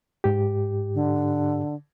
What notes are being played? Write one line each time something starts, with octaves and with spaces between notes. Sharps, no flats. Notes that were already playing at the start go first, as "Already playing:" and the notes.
G#2 G4
D3